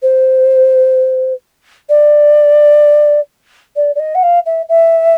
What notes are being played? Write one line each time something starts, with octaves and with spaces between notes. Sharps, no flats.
C5
D5
D5
D5
D#5
F#5
F5
E5
E5